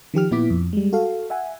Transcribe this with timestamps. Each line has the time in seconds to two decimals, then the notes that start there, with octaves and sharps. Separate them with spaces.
0.14 D#3 F3 G4 F6
0.31 A#2 B3 E4 D6 B6
0.50 F2
0.73 G3 G#3
0.93 F#4 A4 F5
1.30 E5 F#5 G#5